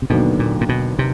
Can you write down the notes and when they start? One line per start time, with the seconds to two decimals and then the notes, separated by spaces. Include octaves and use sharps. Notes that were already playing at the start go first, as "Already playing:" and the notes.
0.02 C3
0.10 D#2 B2 D3 F#3 B3 D4
0.39 A#2
0.61 A#2
0.69 B2
0.99 C3